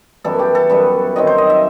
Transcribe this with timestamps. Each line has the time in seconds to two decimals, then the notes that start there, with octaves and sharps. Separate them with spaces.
0.24 F#2 E3 G3 B3 A4
0.39 G4
0.55 A4
0.70 F#2 E3 G3 B3 B4
1.16 D#3 F#3 C4 D#5
1.27 C5
1.38 D#5
1.50 E5